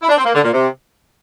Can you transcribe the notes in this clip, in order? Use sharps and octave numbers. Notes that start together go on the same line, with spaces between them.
E4
D4
C4
A#3
D3
A#2
C3